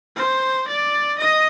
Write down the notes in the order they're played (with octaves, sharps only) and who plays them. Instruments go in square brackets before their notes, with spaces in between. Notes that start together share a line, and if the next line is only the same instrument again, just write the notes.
[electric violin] C5
D5
D#5